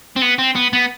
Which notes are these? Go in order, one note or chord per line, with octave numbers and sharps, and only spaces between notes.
C4
B3
C4
B3
B3